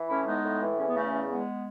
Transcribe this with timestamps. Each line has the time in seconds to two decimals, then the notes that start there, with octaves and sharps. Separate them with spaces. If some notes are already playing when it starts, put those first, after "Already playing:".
Already playing: E3
0.08 A2 C#4 E4
0.26 G#3 B3 D#4
0.43 A2
0.60 E3
0.78 E2 C#4
0.87 B3
0.95 C#3 A3 C#4
1.12 E2
1.29 G#3 B3